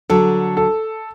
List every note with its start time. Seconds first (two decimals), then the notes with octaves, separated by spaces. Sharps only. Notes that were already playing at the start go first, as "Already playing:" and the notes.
0.10 D3 F#3 A4
0.57 A4